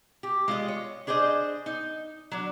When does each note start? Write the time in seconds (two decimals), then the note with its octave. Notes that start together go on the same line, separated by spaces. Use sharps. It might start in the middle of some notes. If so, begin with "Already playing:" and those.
0.23 G4
0.48 G#3 F4 D#5
0.68 C#5
1.07 D4 G#4 C5 D5 D#5
1.66 D#4
2.32 F#3 D4